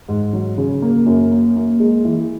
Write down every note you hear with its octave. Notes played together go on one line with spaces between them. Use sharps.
G#2
F#3
C#3
A#3
F#2
A#3
A#3
G#3
E3